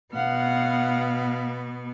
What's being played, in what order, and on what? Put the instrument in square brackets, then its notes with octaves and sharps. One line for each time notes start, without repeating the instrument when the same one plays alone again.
[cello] B2 B3 [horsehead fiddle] F5 F#5